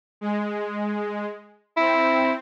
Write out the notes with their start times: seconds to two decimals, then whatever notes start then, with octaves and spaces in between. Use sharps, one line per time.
0.21 G#3
1.77 C4 E4